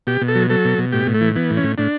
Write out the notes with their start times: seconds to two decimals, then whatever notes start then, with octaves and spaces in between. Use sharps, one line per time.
0.07 B2 G4
0.21 B2
0.28 A4
0.35 F#3
0.50 F#3 A4
0.65 B2
0.78 B2
0.92 A2 G4
1.07 A2
1.14 A3
1.21 E3
1.36 E3 B3
1.50 A2
1.57 C#4
1.63 A2
1.78 A2 D4